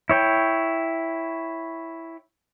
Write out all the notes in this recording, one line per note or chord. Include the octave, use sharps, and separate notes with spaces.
E4 C#5 G5